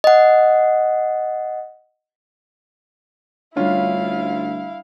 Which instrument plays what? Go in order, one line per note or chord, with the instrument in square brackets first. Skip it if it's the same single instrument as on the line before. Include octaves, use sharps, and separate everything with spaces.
[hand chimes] D#5 F#5
[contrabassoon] D2 [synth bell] G3 D4 [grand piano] C#4 F4 [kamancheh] E4 F5